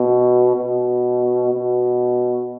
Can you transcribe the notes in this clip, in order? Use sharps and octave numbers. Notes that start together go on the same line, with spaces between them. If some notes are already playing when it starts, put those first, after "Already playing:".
Already playing: B2
B2
B2